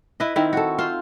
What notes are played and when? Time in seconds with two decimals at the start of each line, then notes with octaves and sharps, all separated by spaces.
0.20 E4 B4 D#5
0.36 D#3 C4 E4
0.53 F#4 A4
0.78 F4 C5